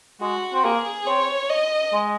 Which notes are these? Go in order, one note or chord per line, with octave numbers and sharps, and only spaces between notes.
G#3 F#4
C4
A#3 G#4
C4 C#5
D#5
G#3